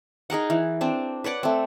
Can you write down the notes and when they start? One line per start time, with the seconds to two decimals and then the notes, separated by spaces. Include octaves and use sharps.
0.30 D#4 G#4 A#4 F#5
0.50 E3
0.81 C4 D4
1.24 B4 C#5 D5 F#5
1.43 A3 C4